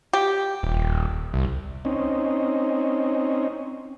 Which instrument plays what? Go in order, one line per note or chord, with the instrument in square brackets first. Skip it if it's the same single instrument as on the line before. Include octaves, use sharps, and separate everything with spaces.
[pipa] G4
[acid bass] D#1
C2
[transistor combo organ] C4 C#4 D#4